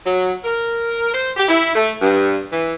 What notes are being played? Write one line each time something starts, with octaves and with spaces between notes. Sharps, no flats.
F#3
A#4
C5
G4
E4
A3
G2
E3